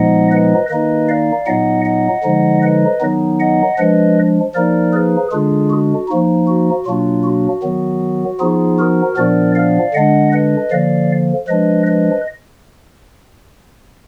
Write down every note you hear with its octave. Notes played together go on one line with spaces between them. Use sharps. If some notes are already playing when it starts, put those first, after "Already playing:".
Already playing: A#2 F3 G#3 B3 D#4 D#5 F#5
B4 D#5
D#3 A#3 D#4 B4 D#5
D5 F5
A#2 F#3 B3 D#4 D#5 F#5
D#5 F#5
D3 F3 G#3 D#4
B4 D#5
D#3 F#3 B3 D#4
D#5 F#5
F3 G#3 D4 B4 D#5
F3 A#3 D#4 A#4 D5
G#4 B4
D3 G#3 D4 F4 G#4
F#4
F3 A#3 D#4
F#4
B2 F#3 A#3 D4 F4
F#4
D#3 F#3 B3
F3 B3 D#4 F4 G#4
F#4 A#4
A#2 F3 B3 D4 A#4 D5
D5 F5
D3 G#3 D4 D#5 F#5
B4 D#5
D3 F3 A#3 D5 F5
F3 G#3 D4 B4 D#5
B4 D#5